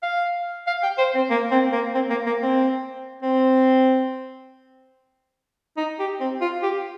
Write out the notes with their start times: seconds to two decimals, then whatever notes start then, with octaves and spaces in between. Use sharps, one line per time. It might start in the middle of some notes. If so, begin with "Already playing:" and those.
0.03 F5
0.67 F5
0.83 G5
0.98 C5
1.15 C4
1.30 A#3
1.51 C4
1.73 A#3
1.95 C4
2.10 A#3
2.26 A#3
2.43 C4
3.22 C4
5.77 D#4
5.99 G4
6.21 C4
6.41 F4
6.63 G4